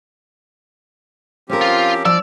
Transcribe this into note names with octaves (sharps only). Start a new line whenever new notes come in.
F3 C4 C#4 G4 A#4
F4
F3 D5 E6